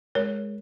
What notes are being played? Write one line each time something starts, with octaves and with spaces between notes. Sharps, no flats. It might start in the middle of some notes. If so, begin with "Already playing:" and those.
G#3 A#4 C#5